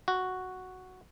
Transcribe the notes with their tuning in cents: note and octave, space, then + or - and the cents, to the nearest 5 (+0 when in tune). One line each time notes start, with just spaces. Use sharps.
F#4 +0